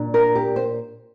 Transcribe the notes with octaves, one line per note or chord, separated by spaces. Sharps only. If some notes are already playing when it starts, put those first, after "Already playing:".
Already playing: A#2 D4
A#4
G4
C5